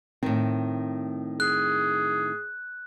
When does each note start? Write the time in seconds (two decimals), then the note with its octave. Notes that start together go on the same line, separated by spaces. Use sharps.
0.23 A2 D#3 C4
1.40 G#4 F#6